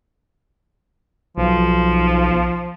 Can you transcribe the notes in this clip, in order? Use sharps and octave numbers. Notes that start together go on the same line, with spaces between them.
B1 F3